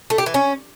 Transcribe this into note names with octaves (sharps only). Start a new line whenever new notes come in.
A3
G4
E3
C#4